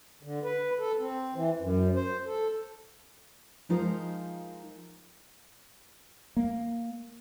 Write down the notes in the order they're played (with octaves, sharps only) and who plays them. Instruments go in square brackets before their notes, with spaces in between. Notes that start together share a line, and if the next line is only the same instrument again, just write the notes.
[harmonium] D3
B4
A4
C4
E3
F#2
C5
A4
[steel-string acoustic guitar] F3 G#3 D#4 F4 A#4 C5
[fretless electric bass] A#3